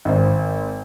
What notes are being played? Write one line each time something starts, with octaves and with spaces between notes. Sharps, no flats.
G#1 C5